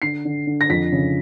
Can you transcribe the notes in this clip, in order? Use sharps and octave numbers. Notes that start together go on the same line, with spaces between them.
D3 C7
D3
D3
A#6
F2 B6
C#3